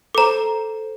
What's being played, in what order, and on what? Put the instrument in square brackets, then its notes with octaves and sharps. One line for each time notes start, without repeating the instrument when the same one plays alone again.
[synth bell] A4 C5 [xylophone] A#5 D6